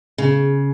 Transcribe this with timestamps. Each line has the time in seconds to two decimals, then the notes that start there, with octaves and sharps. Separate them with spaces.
0.18 C#3